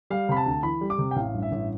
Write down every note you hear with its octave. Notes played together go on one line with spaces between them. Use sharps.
G3 F5
C3 B5
A5
D2
E3 B5
G3
D6
C3
G5
A1 F5
G2
E5
A1